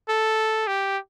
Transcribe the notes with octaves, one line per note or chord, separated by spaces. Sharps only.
A4
G4